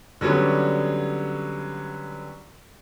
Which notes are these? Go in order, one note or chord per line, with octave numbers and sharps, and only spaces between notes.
D3 F#3 G3 B3 C#4